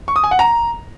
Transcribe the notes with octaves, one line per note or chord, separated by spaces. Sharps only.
C#6
D#6
G#5
F#5
A#5